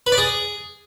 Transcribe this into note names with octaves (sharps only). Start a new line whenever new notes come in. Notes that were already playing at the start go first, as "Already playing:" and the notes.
B4
D5
G#4